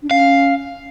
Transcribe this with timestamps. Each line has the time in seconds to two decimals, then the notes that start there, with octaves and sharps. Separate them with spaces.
0.02 D4
0.10 C#4 F5